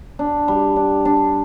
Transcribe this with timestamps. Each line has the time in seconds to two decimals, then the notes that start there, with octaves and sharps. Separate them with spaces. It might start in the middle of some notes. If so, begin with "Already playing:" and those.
0.19 D4
0.48 G3
0.76 D4
1.05 D4